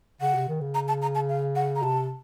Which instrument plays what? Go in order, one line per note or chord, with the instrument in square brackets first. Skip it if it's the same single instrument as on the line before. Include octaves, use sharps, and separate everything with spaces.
[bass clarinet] C#3 [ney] F#5
[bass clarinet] C3
D#3
C#3
[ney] A#5
A5
A#5
A5
F5
F#5
A#5
[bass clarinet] C3 [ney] A5